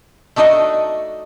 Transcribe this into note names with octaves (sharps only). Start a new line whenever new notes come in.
A3 D4 D#4 F#4 D#5